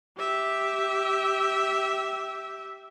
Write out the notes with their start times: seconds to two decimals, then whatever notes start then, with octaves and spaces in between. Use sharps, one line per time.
0.18 G4 E5